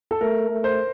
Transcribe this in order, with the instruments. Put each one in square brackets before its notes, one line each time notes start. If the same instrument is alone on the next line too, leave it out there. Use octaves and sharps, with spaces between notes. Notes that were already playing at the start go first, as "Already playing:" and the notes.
[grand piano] A4
[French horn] A3 [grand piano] A#4
[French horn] A3
[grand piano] C5